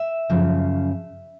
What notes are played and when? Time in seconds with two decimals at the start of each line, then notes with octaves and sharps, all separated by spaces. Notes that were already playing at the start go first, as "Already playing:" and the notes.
Already playing: E5
0.30 F#2 C#3 F3